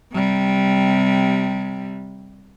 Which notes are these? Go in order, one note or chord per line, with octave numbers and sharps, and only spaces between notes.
C3 G3